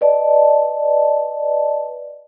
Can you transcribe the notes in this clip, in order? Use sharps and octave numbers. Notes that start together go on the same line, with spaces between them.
B4 D5 D#5 A5